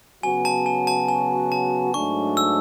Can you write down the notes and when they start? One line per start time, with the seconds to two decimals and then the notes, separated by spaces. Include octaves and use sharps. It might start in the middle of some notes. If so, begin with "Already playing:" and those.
0.23 C#3 F#3 B3 F#4 G#5
0.45 A5
0.66 G#5
0.87 A5
1.08 G#5
1.52 A5
1.94 G#2 F#3 A3 D4 C#6
2.37 E6